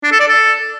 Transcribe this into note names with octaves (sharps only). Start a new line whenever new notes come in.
D4
A4
D5
A4